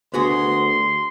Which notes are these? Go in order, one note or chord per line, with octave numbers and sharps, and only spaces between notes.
D2 B3 F#4 G#4 C6